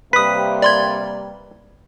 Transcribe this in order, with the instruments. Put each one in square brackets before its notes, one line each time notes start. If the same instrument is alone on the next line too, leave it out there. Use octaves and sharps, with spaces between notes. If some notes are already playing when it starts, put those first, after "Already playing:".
[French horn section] C3 G3 A#3 [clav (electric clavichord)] B4 [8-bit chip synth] D#6 B6
[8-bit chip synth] D5 C6 G#6